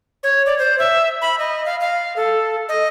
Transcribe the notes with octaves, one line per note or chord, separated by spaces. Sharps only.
C#5
D5
C5
E5
B5
D#5
F5
F5
A4
D#5